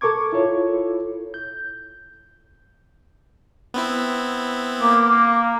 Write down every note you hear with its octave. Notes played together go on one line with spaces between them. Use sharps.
A4 A#4 C#6 D6 G#6
E4 F4 A4 C#5
G6
B3 C4 E4
A#3 D6